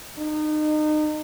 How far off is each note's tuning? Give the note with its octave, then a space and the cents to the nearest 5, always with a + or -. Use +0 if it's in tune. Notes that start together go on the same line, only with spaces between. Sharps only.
D#4 -30